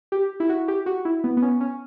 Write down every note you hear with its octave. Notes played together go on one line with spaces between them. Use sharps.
G4
E4
F#4
G4
F#4
E4
B3
B3
C#4
C#4